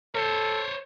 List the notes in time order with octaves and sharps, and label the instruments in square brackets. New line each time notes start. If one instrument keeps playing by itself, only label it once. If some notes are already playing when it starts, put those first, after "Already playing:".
[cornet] A4 [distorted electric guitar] C5 C#5